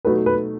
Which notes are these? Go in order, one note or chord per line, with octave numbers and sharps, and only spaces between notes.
B2 F#3 A3 D#4 A4 B4
B4